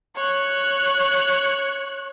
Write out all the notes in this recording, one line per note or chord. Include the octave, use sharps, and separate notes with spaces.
C#5 F#6